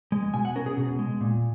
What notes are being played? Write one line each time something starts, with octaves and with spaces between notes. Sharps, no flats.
G#3
B2 G#5
F#5
C#4 A#4
G#4
B2
G#3
A#2